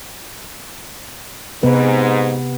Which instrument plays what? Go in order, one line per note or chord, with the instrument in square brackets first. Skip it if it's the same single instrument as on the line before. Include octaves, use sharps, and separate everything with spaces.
[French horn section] G#2 [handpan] C3 B3 B4